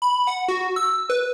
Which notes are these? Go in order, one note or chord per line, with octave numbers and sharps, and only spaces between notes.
B5
F#5
F#4
E6
B4